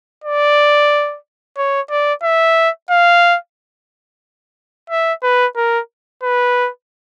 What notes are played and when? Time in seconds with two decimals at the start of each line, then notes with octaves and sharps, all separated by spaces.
0.24 D5
1.58 C#5
1.90 D5
2.23 E5
2.90 F5
4.90 E5
5.23 B4
5.56 A#4
6.23 B4